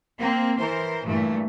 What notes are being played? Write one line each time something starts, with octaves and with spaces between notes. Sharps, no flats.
A#3 C4
E3 A#4 C5
G2 A#2 E3 A3